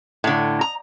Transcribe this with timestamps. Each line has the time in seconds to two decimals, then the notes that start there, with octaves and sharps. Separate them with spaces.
0.24 A2 D3
0.61 A#5